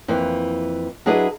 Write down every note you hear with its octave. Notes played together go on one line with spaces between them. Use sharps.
F2 E3 A#3
F#3 D4 E4 G#4 B4 D#5